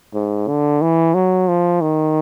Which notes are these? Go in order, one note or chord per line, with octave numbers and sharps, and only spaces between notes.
G#2
D3
E3
F#3
F3
D#3